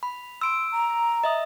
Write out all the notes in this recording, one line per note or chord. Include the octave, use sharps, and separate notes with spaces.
B5
C6 E6 D7
A#5
D#5 E5 D#6